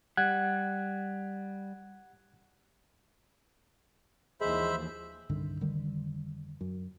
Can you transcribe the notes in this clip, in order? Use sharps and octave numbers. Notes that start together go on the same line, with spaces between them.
G3 F#5 F#6 G#6
D#2 E3 F3 G#3 C5 E5 B5
C2 G2 D3 D#3
F1 D3 D#3 G3
F#2